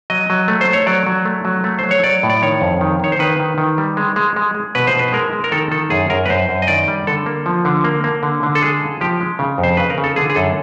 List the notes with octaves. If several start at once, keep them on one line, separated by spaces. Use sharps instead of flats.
F#3 D#5
F#3
A3
C5
A3
C#5
F#3 D5
F#3
A3
F#3
A3
F#3 C5
C#5
F#3 D5
A2
D5
D#3 C#5
F2
D#3
D#3 C#5
C5
D#3 B4
D#3
D#3
G3
G#3
G#3
G#3
G#3
B2 B4
C5
B2
B4
G#3 A#4
G#3
A#4
D#3 A4
D#3 A4
F#2 G#4
F#2 A#4
B4
F#2 C5
F#2
D#5
D#3 D5
G3
D3 A4
A#3
F3
D3
A#3
A#3
D3
D3
A4
G#3 G#4
C#3
F3 G4
G#3
C#3
F2
C5
C#3 B4
A#4
C#3
A4
D3 G#4
G#4
F#2 A4